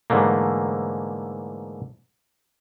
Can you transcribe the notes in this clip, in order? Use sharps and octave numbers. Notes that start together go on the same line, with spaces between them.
G#2 D3 E3 A3 A#3